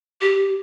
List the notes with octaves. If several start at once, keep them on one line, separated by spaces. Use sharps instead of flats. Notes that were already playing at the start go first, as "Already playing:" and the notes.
G4